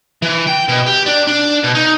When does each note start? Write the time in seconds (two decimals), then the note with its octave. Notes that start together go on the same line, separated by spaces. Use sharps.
0.22 E3
0.47 G5
0.68 B2
0.86 G4
1.06 D4
1.27 D4
1.64 B2
1.75 D#4